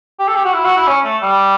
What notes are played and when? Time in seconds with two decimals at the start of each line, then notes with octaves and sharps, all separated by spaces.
0.19 G4
0.28 A4
0.36 G4
0.45 F#4
0.54 E4
0.64 F#4
0.77 E4
0.87 C#4
1.05 A3
1.23 G3